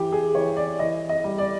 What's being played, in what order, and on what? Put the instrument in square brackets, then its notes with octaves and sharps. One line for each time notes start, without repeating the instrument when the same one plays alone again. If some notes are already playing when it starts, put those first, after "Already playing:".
Already playing: [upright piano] E3 G4
G#4
E3 C#5
D5
E3 D#5
D#5
G3
D5